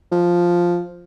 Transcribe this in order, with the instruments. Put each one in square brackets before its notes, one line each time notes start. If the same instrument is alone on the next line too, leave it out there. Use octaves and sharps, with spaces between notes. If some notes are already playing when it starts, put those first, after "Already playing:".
[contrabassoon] F3